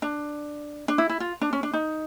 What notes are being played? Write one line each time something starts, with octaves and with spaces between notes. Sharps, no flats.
D4
D4
E4
E4
F4
D4
C#4
D4
D#4